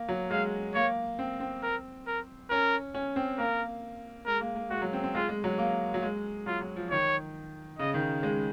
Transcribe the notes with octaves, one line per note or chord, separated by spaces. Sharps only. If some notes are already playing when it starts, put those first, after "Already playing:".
Already playing: A#3
F#3
G#3 F5
A#3 C#5
C4
C4
A#4
A#4
C#4 A#4
C#4
C4
A#3 A#4
G#3 A#4
A#3
A#3
G#3 F#4
F#3
C4
C4
G#3 F4
G#3
F#3
A#3
F#3
G#3
F#3 F4
F#3
F3
D#3 C#5
C#3 D#5
D#3
G#3